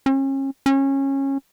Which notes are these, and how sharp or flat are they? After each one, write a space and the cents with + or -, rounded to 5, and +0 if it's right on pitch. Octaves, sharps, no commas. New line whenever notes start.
C#4 -35
C#4 -20